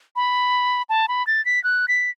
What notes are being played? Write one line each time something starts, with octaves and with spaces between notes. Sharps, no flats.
B5
A5
B5
A6
B6
F#6
B6